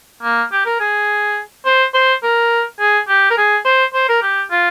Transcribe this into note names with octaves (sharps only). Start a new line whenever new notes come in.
A#3
G4
A#4
G#4
C5
C5
A#4
G#4
G4
A#4
G#4
C5
C5
A#4
G4
F4